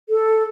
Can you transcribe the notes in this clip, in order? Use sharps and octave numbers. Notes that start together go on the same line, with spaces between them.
A4